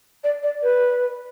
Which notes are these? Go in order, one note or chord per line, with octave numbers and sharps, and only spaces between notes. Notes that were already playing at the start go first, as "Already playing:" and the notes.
D5
D5
B4